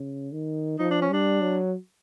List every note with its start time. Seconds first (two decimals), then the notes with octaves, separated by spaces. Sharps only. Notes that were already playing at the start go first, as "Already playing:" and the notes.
Already playing: C#3
0.32 D#3
0.79 F3 D#4
0.91 D4
1.02 C#4
1.10 G3 D4
1.41 F#3